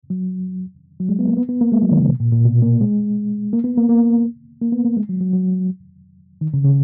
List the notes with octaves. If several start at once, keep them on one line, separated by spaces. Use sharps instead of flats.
F#3
F#3
G#3
B3
A#3
B3
B3
A#3
G#3
F#3
D#3
C#3
B2
A#2
A#2
B2
A#3
G#3
A#3
B3
A#3
A#3
A#3
B3
A#3
G#3
F#3
F#3
F#3
D#3
C#3
C#3